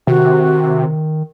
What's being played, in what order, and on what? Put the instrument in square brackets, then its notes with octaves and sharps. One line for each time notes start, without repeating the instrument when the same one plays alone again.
[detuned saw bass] C3 [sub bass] D#3 [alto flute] F#4